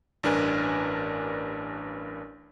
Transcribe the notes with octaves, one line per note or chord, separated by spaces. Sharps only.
A1 G2 D4 A#4 B4 G#5